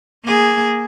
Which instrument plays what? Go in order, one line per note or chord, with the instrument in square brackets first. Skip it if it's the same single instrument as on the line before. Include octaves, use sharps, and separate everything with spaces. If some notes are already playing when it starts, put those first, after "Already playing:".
[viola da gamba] A#3 G#4